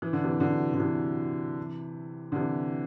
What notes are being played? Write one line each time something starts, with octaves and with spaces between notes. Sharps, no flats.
E3
D3
C3 E3
D3 F#3
D3
C3 E3
D3
C3 E3